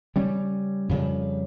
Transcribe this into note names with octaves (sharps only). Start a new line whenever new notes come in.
C#3 G3 C#4
F2 C#3 G3